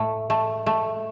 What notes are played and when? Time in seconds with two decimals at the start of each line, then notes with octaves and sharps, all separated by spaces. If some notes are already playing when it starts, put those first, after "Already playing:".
Already playing: A2 A3
0.30 A3
0.66 A3